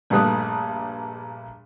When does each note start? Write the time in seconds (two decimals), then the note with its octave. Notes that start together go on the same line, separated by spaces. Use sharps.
0.10 A#1 G2 G3 A3 D#6 F#6